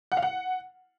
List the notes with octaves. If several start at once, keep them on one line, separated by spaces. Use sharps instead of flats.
F#5
F5
F#5